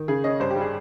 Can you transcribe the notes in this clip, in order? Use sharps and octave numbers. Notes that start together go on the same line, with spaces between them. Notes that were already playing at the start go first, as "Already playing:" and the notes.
Already playing: D#3
C#3 G#4
C#4 D#5
G2 C5
G4
G3 G#4